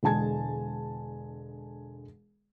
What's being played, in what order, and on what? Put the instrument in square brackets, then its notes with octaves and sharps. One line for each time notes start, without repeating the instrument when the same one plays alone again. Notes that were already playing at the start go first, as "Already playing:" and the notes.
[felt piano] E1 D3 G#3 G#5 A5 G#6